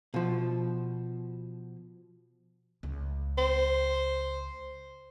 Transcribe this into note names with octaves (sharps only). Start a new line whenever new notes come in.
B2 F3
C#2
C5